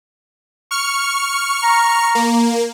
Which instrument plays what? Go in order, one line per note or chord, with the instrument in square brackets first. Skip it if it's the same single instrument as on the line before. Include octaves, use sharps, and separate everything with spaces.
[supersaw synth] C#6 F6 C#7
[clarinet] A#5
[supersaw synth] A#3